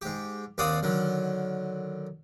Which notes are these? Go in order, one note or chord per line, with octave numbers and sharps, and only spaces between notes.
G#2 G4
D#2 C4 D5 F5 F#5 D#6
D3 D#3 F#3